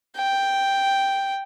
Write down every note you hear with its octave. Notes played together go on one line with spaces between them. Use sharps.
G5